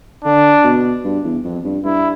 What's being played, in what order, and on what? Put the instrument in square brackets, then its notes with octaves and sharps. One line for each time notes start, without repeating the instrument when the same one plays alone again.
[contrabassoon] D3 [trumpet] D4
[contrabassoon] B2
G2
E2
F2
G2
[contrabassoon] G2 [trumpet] E4